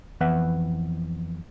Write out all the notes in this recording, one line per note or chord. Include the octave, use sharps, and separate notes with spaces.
F2 E3 B3 B4 E5 F#5